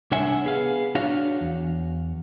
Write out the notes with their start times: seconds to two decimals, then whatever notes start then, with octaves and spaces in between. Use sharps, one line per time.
0.11 C2 D4 C#5 E5 F#5 G#5
0.44 B3 G#4 F5
0.95 D4 F#4 C#5 F5
1.41 E2